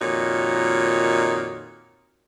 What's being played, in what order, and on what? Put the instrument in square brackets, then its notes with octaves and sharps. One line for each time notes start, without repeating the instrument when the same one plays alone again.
[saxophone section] F2 A#2 D#3 D#4 F#4 C#5